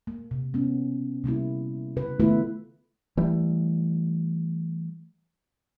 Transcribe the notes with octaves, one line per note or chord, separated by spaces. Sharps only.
A#3
C3
B3 C#4
C3 G3 A#3 E4
C#3 B4
D#3 A3 B3 E4 F4 B4
E3 G3 A3